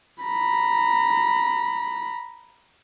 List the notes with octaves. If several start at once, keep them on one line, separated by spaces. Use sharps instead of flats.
A#5 B5